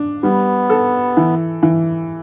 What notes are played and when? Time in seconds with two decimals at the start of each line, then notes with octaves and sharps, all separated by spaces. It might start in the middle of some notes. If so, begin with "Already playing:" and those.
Already playing: D4
0.23 G3 B3
0.70 A4
1.17 E3
1.63 E3